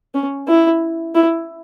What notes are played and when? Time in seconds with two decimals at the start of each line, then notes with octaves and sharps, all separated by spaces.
0.15 C#4
0.48 E4
1.15 E4